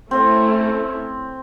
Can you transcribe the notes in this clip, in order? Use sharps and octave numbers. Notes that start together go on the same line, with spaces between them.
A3 C4 C#4 E4